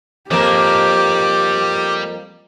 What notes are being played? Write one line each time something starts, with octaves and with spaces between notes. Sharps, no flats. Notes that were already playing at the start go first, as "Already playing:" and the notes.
F2 G3 A#3 G4 A5 D6